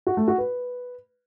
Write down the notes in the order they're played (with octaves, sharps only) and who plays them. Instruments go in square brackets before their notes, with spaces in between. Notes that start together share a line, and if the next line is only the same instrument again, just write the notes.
[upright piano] F#4
A3
F#4
B4